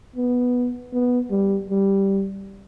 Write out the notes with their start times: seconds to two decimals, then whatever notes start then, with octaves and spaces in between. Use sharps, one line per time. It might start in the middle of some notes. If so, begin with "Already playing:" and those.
0.16 B3
0.93 B3
1.31 G3
1.70 G3